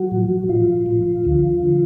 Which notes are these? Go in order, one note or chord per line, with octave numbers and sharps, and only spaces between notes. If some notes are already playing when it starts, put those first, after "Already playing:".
Already playing: F#3 F#4
A2 F3
A2 F3 F4
A2 F3
D2 D3 F3
D3 F3